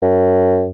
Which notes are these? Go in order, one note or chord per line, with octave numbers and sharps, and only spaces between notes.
F#2